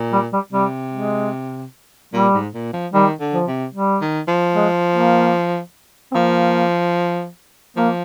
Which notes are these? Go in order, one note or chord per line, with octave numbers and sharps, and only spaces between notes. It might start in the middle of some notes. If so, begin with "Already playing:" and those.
Already playing: A#2
G3
G3
C3 G3
G#3
A#2 G3
G#2
A#2
F3
D#3 G3
D3
F3
C3
G3
D#3
F3
G#3
A#3
C4
F3 A#3
F3 A#3